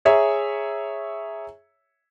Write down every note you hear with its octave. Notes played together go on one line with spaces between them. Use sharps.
G#4 C#5 E5 A#5